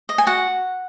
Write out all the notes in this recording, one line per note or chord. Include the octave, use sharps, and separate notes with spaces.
D#5
G#5
F#4 F#5